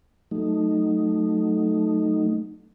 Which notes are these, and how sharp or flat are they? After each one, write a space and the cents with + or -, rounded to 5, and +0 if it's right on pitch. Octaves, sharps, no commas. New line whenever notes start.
F#3 +0 A3 +0 D#4 -5